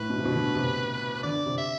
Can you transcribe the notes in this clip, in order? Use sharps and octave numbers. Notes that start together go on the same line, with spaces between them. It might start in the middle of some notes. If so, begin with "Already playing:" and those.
Already playing: A2 B4
B2
C3
B2
D3
C3
D3 D5
C3
E5